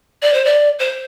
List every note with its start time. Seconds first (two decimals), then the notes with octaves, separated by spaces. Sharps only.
0.22 D5
0.34 C5
0.45 D5
0.79 C5